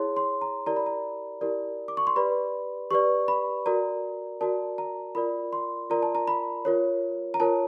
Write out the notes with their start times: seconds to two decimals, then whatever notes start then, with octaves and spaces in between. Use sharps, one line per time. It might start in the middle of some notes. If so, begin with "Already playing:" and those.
Already playing: E4 G#4 C#5 C6
0.17 C6
0.42 A#5
0.66 E4 G4 A#4 D5 A#5
0.76 B5
0.86 A#5
1.41 E4 G4 A#4 D5
1.88 D6
1.97 C#6
2.07 C6
2.16 G4 B4 D5 B5
2.91 G4 B4 D5 C#6
3.28 B5
3.66 F#4 A#4 D5 A#5
4.41 F#4 A#4 D5 A5
4.78 A#5
5.15 F4 A#4 D5 B5
5.53 C6
5.90 F4 A#4 D5 A#5
6.03 A5
6.15 A#5
6.27 B5
6.65 F4 A#4 C#5
7.34 A#5
7.40 F4 A#4 C#5 A5